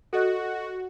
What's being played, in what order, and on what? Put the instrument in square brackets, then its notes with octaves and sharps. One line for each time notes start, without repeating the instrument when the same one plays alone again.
[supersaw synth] F#4 [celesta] A4 D#5 F#6